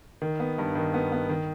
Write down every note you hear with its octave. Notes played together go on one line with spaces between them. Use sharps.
D#3
B3
G2
D#3
B3
B3
D#3